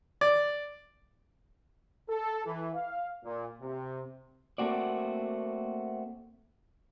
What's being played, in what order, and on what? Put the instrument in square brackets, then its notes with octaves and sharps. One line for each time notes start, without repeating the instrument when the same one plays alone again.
[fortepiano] D5
[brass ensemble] A4
E3
F5
A#2
C3
[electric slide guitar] A3 A#3 C4 F#4 D5